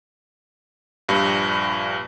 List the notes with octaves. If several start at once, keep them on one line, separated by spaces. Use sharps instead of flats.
A#1 G2